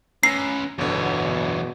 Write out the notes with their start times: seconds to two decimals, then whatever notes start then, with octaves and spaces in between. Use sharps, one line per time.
0.23 C#4 B4 A#5 E6 A#6 C7
0.79 G1 E2 B2 D3 C#5